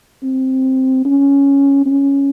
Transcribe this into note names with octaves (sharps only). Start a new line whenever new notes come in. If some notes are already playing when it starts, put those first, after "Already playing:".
C4
C#4
C#4